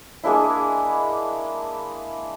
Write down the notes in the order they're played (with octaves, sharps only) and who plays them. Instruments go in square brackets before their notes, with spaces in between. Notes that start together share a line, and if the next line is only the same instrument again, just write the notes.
[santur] G#3 A#3 D4 E4